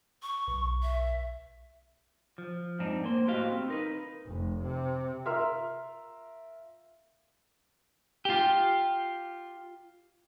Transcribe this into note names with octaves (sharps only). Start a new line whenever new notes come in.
C#6
B1
E5
F3
F2 G#2 C4 D4 D#4
A#3 C5
A2 F#4 G4 C5 D#5 F5
C4
D#4 A#4 B4
F1
C3
F4 A#4 E5 C6 F6
F4 G4